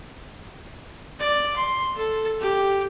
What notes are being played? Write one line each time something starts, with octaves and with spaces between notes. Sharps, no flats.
D5
C6
A4
G4